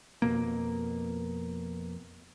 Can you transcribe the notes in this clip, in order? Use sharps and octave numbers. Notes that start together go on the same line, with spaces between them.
F2 B2 A#3